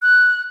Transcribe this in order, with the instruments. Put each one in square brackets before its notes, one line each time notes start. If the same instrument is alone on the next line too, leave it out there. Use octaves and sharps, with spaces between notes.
[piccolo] F#6